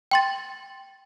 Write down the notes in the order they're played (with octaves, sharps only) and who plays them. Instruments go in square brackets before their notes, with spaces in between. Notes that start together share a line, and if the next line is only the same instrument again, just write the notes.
[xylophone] G5 C6 A6